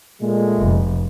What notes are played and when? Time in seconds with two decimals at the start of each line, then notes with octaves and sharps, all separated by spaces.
0.21 A#2 G#3 A3
0.59 F1